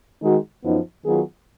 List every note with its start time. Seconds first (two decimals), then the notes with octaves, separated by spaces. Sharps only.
0.22 D#3 G#3 D#4 F#4
0.63 F#2 F3 B3 D#4
1.05 D#3 F#3 B3 F4 G#4